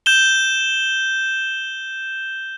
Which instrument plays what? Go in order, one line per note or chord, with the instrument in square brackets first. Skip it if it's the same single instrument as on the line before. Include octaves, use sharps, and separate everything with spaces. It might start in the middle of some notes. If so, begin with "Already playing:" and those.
[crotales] G6 E7 G7